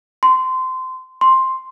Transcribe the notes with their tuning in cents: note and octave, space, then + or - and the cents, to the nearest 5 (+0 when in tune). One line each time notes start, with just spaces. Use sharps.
C6 -20
C6 +5